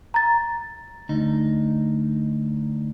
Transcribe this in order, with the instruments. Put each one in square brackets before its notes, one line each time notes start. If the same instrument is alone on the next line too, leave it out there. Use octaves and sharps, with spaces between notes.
[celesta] A#5 A6
[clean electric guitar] D2 D#4